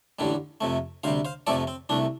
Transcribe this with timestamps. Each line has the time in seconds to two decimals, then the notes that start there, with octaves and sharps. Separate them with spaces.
0.19 A1 G2 D3 G3
0.61 F2 C3 A3
1.04 D2 C3 G3 C5 F5
1.25 C5 F5
1.47 F2 C3 F3 A3 A4 D5
1.67 C4
1.89 C2 C3 A3 D4